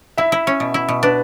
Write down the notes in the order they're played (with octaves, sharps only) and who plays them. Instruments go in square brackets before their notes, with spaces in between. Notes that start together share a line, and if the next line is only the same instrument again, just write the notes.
[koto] E4 [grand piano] E5
[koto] E4
C#4
B2
E4
B2
[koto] D4 [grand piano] B4